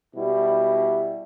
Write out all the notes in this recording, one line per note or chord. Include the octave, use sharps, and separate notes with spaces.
B2 G3 E4